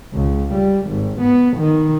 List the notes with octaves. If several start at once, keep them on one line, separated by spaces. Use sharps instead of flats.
C#2
G3
G#1
B3
D#3